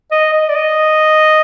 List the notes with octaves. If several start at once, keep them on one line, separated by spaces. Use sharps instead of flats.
D#5
D#5
D5
D#5